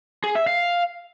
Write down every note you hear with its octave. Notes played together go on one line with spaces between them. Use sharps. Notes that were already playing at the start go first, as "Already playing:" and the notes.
G#4
E5
F5